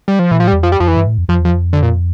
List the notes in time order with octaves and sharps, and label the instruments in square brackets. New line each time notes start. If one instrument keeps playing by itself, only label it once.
[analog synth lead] G3
F3
[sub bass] A#2 [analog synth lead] E3
[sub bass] A2 [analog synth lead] F3
[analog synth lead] G3
[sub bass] E2
[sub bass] F2 [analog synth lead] F3
[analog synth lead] G3
[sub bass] F2 [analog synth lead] F3
[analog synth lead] E3
[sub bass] G2
A2
F2
[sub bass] F2 [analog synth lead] F3
[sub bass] E2
[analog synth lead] F3
[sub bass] F2
[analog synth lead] D3
A#2